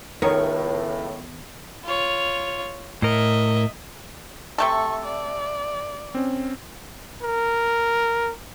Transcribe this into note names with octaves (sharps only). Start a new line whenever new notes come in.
C#2 A2 D#3 B3 A#4 C#5
F4 C#5
A2 A#4 D#5 E5
C3 A3 A4 C#6
D5
C4 C#4
A#4